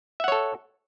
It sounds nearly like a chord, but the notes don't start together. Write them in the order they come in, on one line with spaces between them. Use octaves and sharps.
E5 F#5 C#5 A4